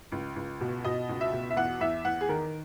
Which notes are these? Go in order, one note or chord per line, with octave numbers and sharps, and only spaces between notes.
C#2
C#2
B2
B2 D#5
C#2
E5
B2
E5
E2 F#5
E2 E5
E2 F#5
G#4
D#3 A#4